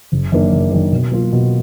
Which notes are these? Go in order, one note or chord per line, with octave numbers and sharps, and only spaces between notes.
F#1
F#2 D#3 A#3 D4
F#1
F#2 D#3 A#3 D4
B2
F#3 A#3 F4
B2